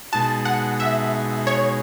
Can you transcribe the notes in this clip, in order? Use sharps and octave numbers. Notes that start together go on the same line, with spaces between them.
B2 G#3 D#4 F#4 A5
F#5
E5
C#5